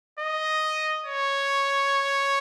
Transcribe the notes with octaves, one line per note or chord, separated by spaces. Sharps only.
D#5
C#5